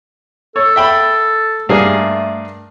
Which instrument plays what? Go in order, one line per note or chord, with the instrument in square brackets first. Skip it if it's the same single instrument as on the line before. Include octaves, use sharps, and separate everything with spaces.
[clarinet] A4 [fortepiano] C#5
[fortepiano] E5 G5 B5
[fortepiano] G2 A#3 G#4 [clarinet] A3